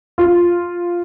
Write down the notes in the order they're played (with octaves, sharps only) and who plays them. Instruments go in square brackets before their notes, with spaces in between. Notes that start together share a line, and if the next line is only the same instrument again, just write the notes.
[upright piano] F4